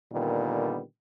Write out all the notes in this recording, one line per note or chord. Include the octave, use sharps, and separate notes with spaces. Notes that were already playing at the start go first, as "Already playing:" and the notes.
A#2 D3 D#3 G3 B3